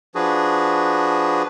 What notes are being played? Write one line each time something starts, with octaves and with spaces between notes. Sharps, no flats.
F3 D4 F#4 G#4 B4